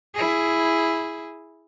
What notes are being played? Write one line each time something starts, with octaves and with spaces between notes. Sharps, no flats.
E4 G#4